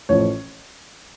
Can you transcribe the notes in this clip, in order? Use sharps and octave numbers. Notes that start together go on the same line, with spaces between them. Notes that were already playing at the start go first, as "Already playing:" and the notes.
A1 A2 F3 C#5